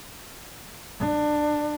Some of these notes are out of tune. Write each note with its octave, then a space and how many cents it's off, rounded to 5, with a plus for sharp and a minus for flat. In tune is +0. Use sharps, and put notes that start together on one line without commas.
D4 +20